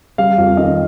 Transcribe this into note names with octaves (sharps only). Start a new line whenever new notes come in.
G3 F5
F2 F5
D#3 D#5